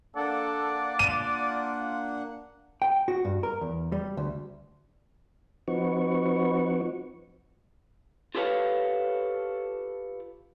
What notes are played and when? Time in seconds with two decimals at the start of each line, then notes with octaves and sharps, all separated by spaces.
0.16 A#3 D4 A4 D5 F#5
0.99 F4 D#7
2.82 G5
3.08 F#4
3.25 G2
3.43 A#4
3.61 E2
3.92 G3
4.17 D2
5.68 F3 C4 D#4 F#4 B4 C#6
8.35 F4 G4 A4 B4 C#5 F5